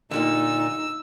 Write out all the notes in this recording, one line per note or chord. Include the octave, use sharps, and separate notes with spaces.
A#2 D3 G3 A#3 D#4 E6